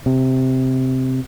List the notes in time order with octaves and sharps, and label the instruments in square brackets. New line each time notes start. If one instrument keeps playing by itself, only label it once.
[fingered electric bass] C3